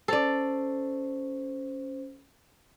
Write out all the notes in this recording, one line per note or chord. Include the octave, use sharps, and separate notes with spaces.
C#4 A4 C5 D5